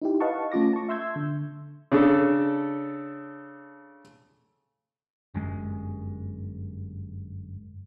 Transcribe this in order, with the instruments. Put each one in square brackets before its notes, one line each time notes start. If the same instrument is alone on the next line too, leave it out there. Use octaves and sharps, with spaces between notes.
[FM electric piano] D#4 E4 G4
B4 D#5 F5 F#5 A5 C#6
A3 C#4 F4 D6 A#6
A5 C#6
E5 C6 E6 G6 G#6
D3
[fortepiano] C#3 D4 A4
[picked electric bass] G1 F#2 G#3